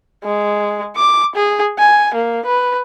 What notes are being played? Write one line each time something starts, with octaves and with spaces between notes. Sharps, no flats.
G#3
D6
G#4
G#5
A#3
B4